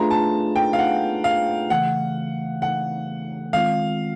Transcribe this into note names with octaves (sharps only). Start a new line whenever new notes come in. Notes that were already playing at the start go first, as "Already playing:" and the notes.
Already playing: A3 D4 F4 G#4 B4 A#5
A5
G5
F5
F#5
F5
C#3 E3 A3 F#5
F#5
D#3 G#3 C4 F4 F5